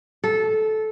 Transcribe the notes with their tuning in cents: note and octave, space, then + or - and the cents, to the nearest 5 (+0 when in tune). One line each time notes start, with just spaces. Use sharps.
A4 -15